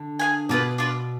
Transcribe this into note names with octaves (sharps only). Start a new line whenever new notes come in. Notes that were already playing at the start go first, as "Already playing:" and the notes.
Already playing: D3
G#4 B4 F5 G#5
B2 A#3 F4 G#4 B4
D4 F4 B4